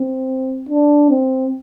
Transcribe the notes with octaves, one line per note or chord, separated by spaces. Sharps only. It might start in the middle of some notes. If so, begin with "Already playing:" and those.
Already playing: C4
D4
C4